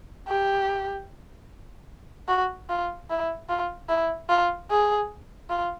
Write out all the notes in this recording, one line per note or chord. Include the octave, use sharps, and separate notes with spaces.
G4
F#4
F4
E4
F4
E4
F4
G#4
F4